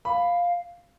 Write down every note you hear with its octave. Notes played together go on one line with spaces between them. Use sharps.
F5 B5